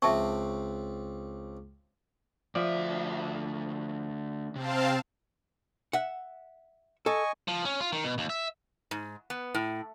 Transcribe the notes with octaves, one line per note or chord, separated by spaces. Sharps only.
C#2 C4 E5 A5 C#6
D2 F3 D5 E5
C3 C4 F5 A5
E5 F#5
A4 D#5 G#5 C#6
F3
C#4
F4
D#3
B2
D#2
E5
G#2
B3
A2